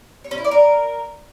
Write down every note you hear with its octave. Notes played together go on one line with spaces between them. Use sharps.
C#5
C#4
E4
D5
A#4